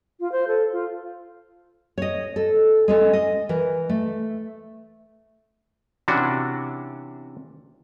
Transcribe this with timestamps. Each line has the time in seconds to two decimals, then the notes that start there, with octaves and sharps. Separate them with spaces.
0.20 F4
0.32 C5
0.48 A4
0.72 F4
1.98 C#5 D#5
2.36 A4
2.88 G#3 C#4 A4
3.13 D#5
3.49 E3 A#4
3.89 A3
6.08 C3 E3 C#4 D4 F#4